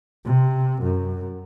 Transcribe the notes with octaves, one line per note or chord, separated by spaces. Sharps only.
C3
F#2